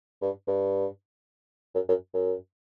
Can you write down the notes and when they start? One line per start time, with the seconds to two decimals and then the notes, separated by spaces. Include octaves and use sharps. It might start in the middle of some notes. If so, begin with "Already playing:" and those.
0.22 G2
0.48 G2
1.75 F#2
1.88 F#2
2.14 F#2